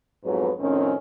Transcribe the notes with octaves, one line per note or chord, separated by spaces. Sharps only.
F2 G#2 F#3 B3 B4
F2 A2 D#3 C4 C#4